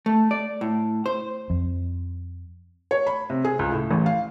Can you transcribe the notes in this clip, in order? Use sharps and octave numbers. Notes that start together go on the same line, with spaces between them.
A3
D5
A2
C5
F2
C#5
B5
C3
G#4
C#2
A2
A1
F5